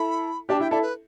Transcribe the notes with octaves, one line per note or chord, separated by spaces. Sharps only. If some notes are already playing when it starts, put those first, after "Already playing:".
Already playing: E4 A4 B5
D4 G4 A5
E4 G5
E4 A4 D5
B4